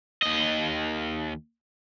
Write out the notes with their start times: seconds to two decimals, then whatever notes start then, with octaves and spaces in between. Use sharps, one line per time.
0.22 D#2 D#5